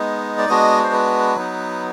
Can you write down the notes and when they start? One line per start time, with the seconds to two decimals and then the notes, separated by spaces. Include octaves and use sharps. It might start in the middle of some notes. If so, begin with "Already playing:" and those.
Already playing: G#3 B3 D#4
0.38 D5
0.49 G#3 B3 D4 F#4 D#5
0.84 C5
0.92 B4
1.35 F#3 B3 D#4